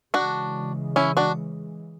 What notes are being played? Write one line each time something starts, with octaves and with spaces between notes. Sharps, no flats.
C#3 E3 G#3 D4 F#4
C#4 E4
D4 F#4